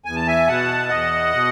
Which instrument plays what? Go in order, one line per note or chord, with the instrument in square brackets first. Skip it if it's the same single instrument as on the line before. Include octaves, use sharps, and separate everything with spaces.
[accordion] E2 G#5
A5
E5 G#5
B2 F#5 A5
E2 D#5 F#5
B2